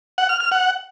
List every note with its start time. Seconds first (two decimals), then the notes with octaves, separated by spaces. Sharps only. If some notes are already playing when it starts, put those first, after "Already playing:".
0.18 F#5
0.29 F6
0.40 F6
0.52 F#5